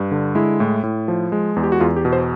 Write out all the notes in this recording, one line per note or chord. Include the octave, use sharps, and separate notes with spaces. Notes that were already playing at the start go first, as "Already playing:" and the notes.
Already playing: G2
D3
G#3 E4
A2
A2
F3
G#3
E2
G4
F#4
E2 F4
G4
B2
C5